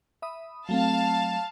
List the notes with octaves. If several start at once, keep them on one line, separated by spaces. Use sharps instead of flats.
E5 B5 D#6
F#3 A3 C4 F5 A5